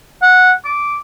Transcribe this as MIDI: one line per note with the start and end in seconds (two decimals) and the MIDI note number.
0.22 0.52 78
0.65 0.97 86